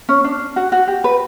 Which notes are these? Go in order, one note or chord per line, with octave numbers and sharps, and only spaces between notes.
C#4
D4
F#4
F#4
G4
B4